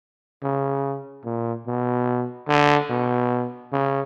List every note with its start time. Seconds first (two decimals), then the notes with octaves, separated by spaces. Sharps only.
0.43 C#3
1.24 A#2
1.67 B2
2.49 D3
2.90 B2
3.72 C#3